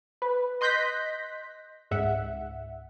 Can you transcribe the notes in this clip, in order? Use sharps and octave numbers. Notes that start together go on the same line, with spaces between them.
B4
D#5 C6 F#6 G6 A#6 B6
C#2 G#2 E5 F#5